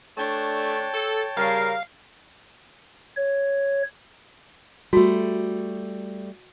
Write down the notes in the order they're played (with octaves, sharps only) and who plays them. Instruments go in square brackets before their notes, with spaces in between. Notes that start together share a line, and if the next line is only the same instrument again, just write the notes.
[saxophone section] A3 D4 [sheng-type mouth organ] C#5 G5 A5
[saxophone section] A4
[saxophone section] C#3 G3 [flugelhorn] A#4 [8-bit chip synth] F5 C7
[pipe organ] C#5
[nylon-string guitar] G3 A3 [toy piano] F#4 A4